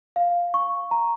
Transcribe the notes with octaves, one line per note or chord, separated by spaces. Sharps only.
F5
C#6
A#5